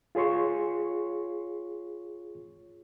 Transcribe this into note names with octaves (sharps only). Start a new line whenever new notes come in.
F4 G#4 C#5 C6 C#6